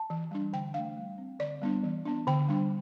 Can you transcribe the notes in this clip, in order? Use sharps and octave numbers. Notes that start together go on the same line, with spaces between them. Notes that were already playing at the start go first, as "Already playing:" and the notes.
Already playing: A5
E3
G3 D4
D3 G5
A3 D4 F5
G3
C4
D3 D5
G3 B3 D4
E3
B3 D4
D3 G5
G3 D4